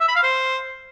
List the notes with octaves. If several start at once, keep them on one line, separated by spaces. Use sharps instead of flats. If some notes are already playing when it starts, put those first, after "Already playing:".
E5
B5
F5
C5